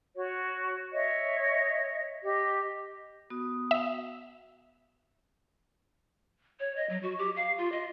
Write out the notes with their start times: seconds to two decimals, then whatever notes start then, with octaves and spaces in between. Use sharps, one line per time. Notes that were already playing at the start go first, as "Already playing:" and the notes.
0.16 F#4 C#5
0.93 C#5 D#5 E5
2.24 G4 D#5
3.30 B3 F#4 D#6
3.71 E5
6.60 C#5
6.76 D#5
6.90 F#3
7.03 F#4
7.18 G4
7.36 F5
7.58 F4
7.72 D#5